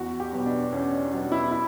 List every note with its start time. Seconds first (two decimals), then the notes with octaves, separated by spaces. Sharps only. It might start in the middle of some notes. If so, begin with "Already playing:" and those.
Already playing: E2 F#4
0.20 G4
0.33 B2 F#3 B3
0.46 D4
0.72 E2 C#4
0.92 D4
1.12 B2 F#3 B3 D4
1.32 E4
1.51 E4